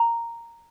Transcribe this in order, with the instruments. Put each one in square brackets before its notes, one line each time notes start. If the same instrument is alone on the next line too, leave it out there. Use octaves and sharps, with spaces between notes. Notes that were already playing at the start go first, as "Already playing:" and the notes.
Already playing: [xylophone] A#5